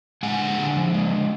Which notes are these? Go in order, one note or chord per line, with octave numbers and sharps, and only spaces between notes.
G#3 F#5 G#5
D3
D3
F3
G#3
D3